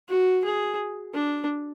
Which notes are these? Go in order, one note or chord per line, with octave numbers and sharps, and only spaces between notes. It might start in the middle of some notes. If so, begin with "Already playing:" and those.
F#4
G#4
D4